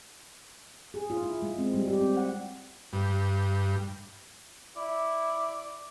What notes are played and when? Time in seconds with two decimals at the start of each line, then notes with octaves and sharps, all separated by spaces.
0.94 G#4
1.10 F4
1.23 E4
1.42 G#3
1.58 C4
1.74 G3
1.88 G4
2.01 C4
2.17 F#5
2.93 G2
4.77 E4 D5